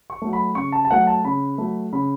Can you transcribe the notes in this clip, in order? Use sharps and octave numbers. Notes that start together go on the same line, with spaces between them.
C#6
F#3 A3
B5
C#3 C#6
A5
A5
F#3 A3 F#5
A5
C#3 B5
F#3 A3
C#3 B5